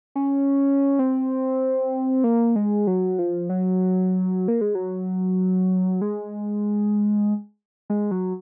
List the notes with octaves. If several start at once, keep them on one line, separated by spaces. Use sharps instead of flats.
C#4
C4
A#3
G#3
F#3
F3
F#3
A#3
G#3
F#3
G#3
G#3
F#3